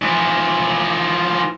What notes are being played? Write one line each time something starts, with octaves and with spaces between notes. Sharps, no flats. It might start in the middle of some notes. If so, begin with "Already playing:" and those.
E3 F3